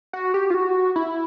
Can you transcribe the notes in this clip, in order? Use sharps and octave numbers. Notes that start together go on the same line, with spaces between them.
F#4
G4
F4
F#4
E4